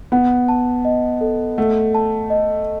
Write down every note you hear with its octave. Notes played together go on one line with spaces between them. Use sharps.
B3 F#5
A5
D#5
A4
A3 F#5
A5
D#5